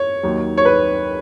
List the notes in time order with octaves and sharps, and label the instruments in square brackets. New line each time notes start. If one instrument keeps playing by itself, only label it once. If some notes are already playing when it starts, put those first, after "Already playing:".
Already playing: [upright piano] C#5
D#2 D#3 F#3
C#5
B4